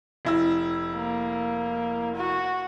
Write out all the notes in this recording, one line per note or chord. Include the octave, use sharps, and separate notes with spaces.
F1 E4 E6
A#3
F#4